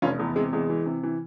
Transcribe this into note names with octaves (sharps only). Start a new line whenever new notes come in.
F1 C#4 F4
E2
C3 G#3
E2 G#3
E3
C3
E3